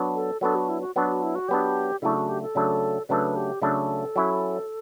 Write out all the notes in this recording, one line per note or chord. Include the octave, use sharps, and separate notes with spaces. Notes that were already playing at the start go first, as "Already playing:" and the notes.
Already playing: F#3 B3 D4
A4
F#3 B3 D4 A4
F#4
E4
F#4
F#3 B3 D4 F#4
F#4
E4
F#4
F#3 B3 D4 G4
C#3 F#3 A3 D4 E4
F#4
G4
A4
C#3 F#3 A3 D4
C#3 F#3 A3 D4 B4
G4
C#3 F#3 A3 D4 A4
F#3 C#4 E4